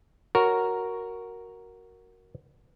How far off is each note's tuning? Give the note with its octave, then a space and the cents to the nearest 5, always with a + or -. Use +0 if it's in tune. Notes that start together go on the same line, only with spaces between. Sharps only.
F#4 +0 A#4 +0 C#5 +0